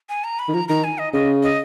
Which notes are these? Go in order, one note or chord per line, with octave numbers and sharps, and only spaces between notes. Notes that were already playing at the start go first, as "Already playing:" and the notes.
G#5
A#5
B5
D#3
F3 A#5
D#3 A#5
G#5
D#5
C#3 D#5
D#5